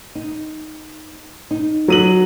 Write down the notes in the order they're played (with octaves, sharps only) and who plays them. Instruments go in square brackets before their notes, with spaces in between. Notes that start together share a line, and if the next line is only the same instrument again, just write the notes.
[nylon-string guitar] D#4
D#4
[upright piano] F#3 D#7 F#7